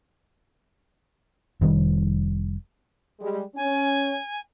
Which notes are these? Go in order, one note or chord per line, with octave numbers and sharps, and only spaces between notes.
F1 D#3 G3
G3 G#3
C#4 G#5